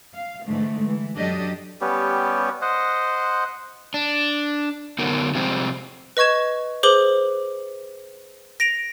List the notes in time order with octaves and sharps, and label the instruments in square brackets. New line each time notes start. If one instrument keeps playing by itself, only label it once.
[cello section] F5
G#2 D3 E3 G#3 A3
E3
F#2 F#3 D4 G4 A4 D#5
[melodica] G3 B3 C#4 G4
C5 D#5 F#5
[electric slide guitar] D4
D3 F#3 B3 D#4 A#4
C3 F3 G3 G#3 C4
[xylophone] B4 D#5 C#6 G#6 E7
G#4 B4 C5 D6 F#7 G7
A#6 D7 F7